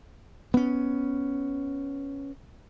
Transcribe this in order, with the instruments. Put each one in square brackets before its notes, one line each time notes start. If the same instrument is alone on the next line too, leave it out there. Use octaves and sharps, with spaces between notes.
[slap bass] B3 C#4